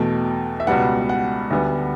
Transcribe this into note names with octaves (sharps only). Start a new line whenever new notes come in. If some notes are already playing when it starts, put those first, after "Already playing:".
Already playing: E2 B2 A3 G5
E5
C#2 B2 G3 B3 F#5
F#5
D2 D3 G3 B3